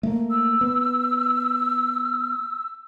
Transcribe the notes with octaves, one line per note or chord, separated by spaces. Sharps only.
A3 A#3
E6
B3